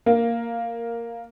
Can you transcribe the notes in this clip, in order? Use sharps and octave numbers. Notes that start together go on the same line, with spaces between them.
A#3